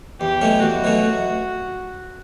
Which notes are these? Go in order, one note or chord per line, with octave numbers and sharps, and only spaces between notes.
E2 G4
B2 F#3 A3 C#4
E2 F#4
B2 F#3 A3 C#4